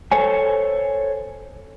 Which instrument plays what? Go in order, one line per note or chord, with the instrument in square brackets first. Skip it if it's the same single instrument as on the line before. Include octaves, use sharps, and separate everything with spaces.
[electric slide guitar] A4 C5 C#5 G#5